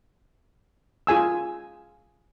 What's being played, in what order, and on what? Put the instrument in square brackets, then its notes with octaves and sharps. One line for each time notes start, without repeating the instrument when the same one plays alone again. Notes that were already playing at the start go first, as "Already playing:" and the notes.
[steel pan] F4 G#4 G#5 E6